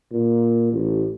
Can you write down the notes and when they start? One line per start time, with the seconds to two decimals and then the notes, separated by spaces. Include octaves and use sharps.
0.12 A#2
0.72 A1